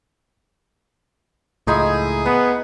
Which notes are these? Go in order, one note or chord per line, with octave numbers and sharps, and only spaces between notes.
C#2 A2 F3 D#4 E4 G#4
B3 F#5